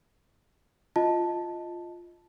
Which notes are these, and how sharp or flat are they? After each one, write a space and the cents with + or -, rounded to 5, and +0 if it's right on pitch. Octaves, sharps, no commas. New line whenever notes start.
F4 +0 D#5 +10 A5 +0